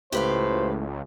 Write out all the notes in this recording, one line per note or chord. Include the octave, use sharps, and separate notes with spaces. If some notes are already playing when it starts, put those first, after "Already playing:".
C#2 A2 G4 B4 C5 F5